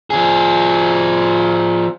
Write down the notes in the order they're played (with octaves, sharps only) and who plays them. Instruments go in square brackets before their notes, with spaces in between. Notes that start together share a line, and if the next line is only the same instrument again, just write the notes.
[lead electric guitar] F3 G#4